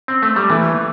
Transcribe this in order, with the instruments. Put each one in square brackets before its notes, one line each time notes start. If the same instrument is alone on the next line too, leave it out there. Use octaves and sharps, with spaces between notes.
[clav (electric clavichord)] C4
A3
G3
[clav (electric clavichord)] E3 [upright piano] A3